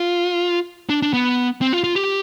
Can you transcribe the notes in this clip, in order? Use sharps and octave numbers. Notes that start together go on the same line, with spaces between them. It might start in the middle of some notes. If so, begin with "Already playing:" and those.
Already playing: F4
D4
D4
B3
C4
F4
F4
G4